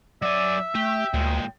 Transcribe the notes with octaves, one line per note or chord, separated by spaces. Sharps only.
F#3 D5 E5 G#5
A3 G4 G5
D2 A#2 G#3